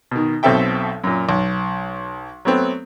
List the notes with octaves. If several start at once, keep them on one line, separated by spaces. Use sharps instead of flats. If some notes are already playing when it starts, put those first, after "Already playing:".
B2 D#3
B1 B2 C4 A4 E5 G5
F#2 A#2
B1
F#3 A3 B3 C4